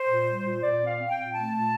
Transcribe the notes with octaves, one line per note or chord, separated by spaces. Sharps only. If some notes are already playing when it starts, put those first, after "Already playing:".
Already playing: C5
A#2
G3
A#2
A#2 D5
C4
F5
C4
G5
A#2
A3 A5
A#2